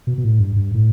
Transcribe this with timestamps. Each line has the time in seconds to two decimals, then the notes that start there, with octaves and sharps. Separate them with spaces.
0.07 B2
0.18 B2
0.24 A2
0.40 G2
0.56 G2
0.74 A2